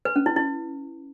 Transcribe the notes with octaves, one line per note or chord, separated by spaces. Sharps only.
B4
C#4
E4
E4